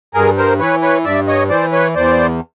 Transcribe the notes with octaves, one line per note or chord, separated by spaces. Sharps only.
G2 G#4 A#4
A#4 C5
E3 B4 C#5
B4 C#5
G2 D5 E5
C#5 D#5
E3 C5 D5
B4 C#5
E2 C5 D5